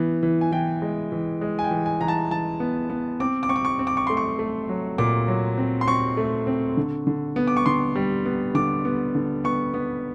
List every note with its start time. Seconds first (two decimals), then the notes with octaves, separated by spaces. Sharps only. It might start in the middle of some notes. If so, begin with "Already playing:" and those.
Already playing: E3 B3
0.23 E3
0.41 G#5
0.52 E3 G5
0.82 G#3
1.12 E3
1.41 G#3
1.59 G#5
1.64 G5
1.71 E3
1.86 G#5
2.01 E3 A#5
2.08 A5
2.31 E3 A5
2.60 B3
2.90 B3
3.20 C4 D6
3.43 D6
3.49 C4 C#6
3.56 D6
3.65 C#6
3.79 C4
3.87 D6
3.97 C#6
4.07 A3 C6
4.17 C#6
4.39 A3
4.69 F#3
4.98 A#2 D6
5.28 F#3
5.58 C4
5.81 C6
5.87 C4 C#6
6.17 A3
6.47 C4
6.77 D3
7.07 D3
7.36 B3
7.47 D6
7.57 C#6
7.66 D3 C6
7.95 G3
8.26 B3
8.54 D3 D6
8.85 B3
9.15 D3
9.44 B3 C#6
9.74 B3